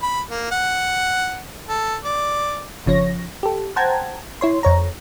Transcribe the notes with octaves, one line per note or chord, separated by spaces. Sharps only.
B5
A#3
F#5
A4
D5
G1 C#3 F3 C#5 A#6
G4 A4
C5 F#5 G5 A5 A#5 G#6
E4 C#5 C6
F2 C#5 A#5